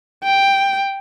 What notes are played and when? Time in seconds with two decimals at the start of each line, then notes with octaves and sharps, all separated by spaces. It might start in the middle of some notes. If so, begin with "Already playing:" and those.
0.24 G5